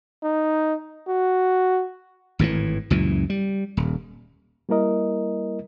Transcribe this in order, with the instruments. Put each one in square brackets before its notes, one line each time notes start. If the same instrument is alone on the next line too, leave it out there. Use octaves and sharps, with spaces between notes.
[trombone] D#4
F#4
[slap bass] G#1 A2 C#3 E3
C#2 F#2 A#2 E3
G3
D#1
[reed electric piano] G3 A#3 E4 A#4 D#5